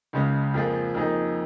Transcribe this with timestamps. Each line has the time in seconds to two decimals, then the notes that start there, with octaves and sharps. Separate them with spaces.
0.13 C#2 C#3 G#3 C#4
0.54 F2 F3 A#3 F4 G#4
0.95 F2 F3 A#3 D#4 G#4